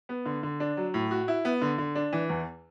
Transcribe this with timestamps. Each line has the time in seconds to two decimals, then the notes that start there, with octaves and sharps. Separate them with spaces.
0.09 B3
0.26 D3
0.43 D3
0.60 D4
0.77 F#3
0.94 A2
1.11 F#4
1.28 E4
1.45 B3
1.61 D3
1.78 D3
1.95 D4
2.13 E3
2.30 E2